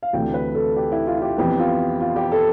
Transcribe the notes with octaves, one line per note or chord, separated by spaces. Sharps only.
F5
D2 C3 E3 A3 G5
B4
A4
G4
E4
F4
F4
G4
F2 E3 B3 G4
F4
F4
G4
A4